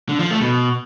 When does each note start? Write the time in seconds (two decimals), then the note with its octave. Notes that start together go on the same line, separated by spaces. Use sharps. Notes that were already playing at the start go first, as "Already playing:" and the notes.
0.09 D3
0.20 F3
0.30 A3
0.41 B2